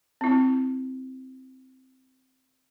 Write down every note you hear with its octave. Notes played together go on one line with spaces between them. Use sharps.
C4 E4